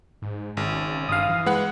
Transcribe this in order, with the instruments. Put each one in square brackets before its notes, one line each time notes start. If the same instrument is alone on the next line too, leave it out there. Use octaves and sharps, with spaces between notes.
[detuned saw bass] G#2
[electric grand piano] G#1 [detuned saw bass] C#3
[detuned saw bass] G2 [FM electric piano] F5 D#6
[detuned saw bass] E3
[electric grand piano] G#3 F#5 [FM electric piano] B3 F#6